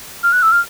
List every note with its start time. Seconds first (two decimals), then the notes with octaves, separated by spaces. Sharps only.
0.23 F6
0.32 F#6
0.43 E6
0.52 F6